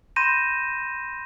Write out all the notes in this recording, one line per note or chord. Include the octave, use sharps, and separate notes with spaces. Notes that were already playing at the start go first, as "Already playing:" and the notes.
B5 C6 G6 A#6 D#7 E7